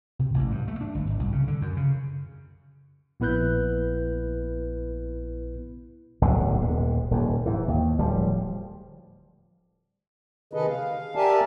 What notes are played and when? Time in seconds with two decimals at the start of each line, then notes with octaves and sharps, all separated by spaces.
0.19 C3
0.34 A1
0.51 G2
0.68 A3
0.81 D4
0.95 G1
1.07 G#1
1.19 C2
1.32 C#3
1.47 D3
1.61 F#2
1.77 C#3
3.20 A#1 B3 E4 B4 F#6 G6
6.22 D1 B1 G#2 D3
6.60 D#1 G#2
7.11 D#1 D#2
7.46 G#2 E3
7.68 D#2
7.99 D1 F3 G3
10.53 C3 D#3 G#4 A4 B4 D#5
10.68 F5
11.15 G4 A#4 D5 E5 G#5 A5